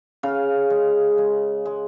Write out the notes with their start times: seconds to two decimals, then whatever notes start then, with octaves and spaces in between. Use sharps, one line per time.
0.23 C#3 F5
0.70 G#3
1.18 G#3
1.65 G#3